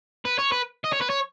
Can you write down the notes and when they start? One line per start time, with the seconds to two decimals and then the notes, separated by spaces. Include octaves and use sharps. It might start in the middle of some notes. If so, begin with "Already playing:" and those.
0.25 B4
0.38 C#5
0.52 B4
0.84 D#5
0.92 C#5
1.01 B4
1.09 C#5